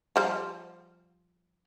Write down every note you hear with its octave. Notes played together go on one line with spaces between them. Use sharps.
F3 G3 C5